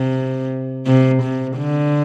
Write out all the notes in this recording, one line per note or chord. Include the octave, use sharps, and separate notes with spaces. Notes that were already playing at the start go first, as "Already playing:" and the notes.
Already playing: C3
C3
C3
D3